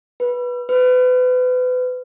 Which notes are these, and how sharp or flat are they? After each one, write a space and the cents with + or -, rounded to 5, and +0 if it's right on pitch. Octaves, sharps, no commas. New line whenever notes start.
B4 -10
B4 +30